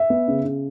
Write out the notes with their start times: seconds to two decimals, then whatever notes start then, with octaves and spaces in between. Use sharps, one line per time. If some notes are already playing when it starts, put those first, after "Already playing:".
Already playing: E5
0.10 B3
0.28 C#3
0.44 C#3